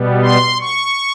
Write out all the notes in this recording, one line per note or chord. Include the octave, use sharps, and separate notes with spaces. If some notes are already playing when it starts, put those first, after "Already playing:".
Already playing: B2 G3 B3
C6
C#6